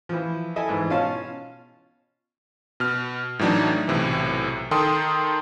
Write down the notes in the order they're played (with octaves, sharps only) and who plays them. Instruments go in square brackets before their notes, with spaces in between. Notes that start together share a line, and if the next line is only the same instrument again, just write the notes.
[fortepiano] E3 F3
E4 A4 D#5 E5 G#5
G#2 E3
B2 C#4 F4 F5 A5
[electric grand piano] B2 F6
A2 E3 F#3 D4 D#4
B1 A2 C3 E3
D#3 A4 G5 C6 D#6